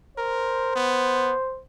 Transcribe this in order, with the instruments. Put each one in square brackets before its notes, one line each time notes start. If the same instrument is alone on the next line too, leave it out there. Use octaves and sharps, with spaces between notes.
[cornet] A#4 [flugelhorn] C5
[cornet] B3